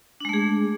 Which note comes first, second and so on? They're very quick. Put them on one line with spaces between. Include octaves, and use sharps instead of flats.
D4 G#3 A3 G#4